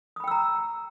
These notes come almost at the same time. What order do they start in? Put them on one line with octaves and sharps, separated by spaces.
D#6 B5 G5 E6 A#5